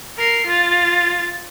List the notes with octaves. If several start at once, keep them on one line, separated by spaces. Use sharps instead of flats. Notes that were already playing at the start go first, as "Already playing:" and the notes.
A#4 C7
F4 A6